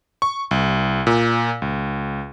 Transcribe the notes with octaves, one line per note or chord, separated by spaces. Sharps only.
C#6
C2
A#2
C#2